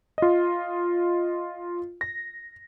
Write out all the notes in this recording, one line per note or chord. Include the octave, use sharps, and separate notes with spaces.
F4 D#5
A#6